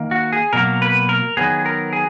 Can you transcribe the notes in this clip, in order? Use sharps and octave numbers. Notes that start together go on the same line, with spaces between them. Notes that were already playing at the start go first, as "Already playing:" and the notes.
Already playing: D#3 A#3
F#4
G#4
B2 F#3 A#3 A#4
B4
A#4
D#3 F#3 B3 G#4
A#4
G#4